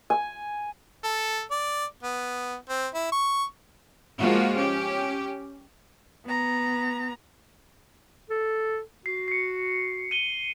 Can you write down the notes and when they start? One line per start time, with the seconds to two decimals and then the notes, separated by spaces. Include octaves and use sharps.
0.10 G#5
1.04 A4
1.51 D5
2.03 B3
2.69 C4
2.94 E4
3.12 C#6
4.19 F3 G#3 A#3 F4 F#4
4.57 C#4 G4
6.26 B3 A#5
8.30 A4
9.06 F#4 C7
9.28 C7 C#7
10.11 D#7 G7